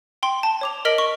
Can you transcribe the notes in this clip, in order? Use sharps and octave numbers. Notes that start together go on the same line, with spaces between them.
G5 C6
A5
C#5 D6 F7
A#4 D#5 F6 B6 D7 F#7
C#6